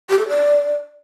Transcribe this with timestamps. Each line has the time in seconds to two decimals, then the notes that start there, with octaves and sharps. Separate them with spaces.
0.10 G4
0.19 A4
0.28 D5